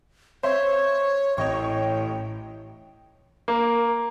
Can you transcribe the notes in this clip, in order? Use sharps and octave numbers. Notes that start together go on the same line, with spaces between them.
C5 C#5 E5 C6
A1 C#5 D#5 G5 C#6
A#3